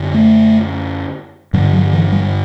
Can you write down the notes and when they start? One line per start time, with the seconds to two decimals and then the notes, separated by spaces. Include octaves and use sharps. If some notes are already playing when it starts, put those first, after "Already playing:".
Already playing: F#2 D3
0.14 A3
1.53 G2 D3 G3
1.73 F#3
1.93 E3
2.12 G3